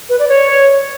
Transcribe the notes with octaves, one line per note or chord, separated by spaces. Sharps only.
B4
D5
C#5